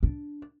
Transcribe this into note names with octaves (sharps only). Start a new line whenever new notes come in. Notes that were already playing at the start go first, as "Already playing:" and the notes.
D4